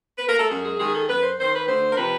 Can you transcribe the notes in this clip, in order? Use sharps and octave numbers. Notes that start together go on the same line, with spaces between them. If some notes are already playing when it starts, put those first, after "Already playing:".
B4
A#4
A4
F#2 G#4
G#4
D#3 G#4
A4
F#2 B4
C5
D#3 C5
B4
D2 C5
A#4
C3 F3 B4